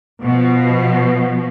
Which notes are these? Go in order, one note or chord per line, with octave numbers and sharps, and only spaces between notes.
B2 F3